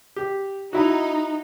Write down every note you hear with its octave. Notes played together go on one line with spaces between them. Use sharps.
G4
D#4 E4 F#4